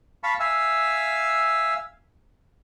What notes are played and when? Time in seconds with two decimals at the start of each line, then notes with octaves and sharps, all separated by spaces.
0.23 F5 A5 B5 C#6
0.40 E5 F5 G#5 E6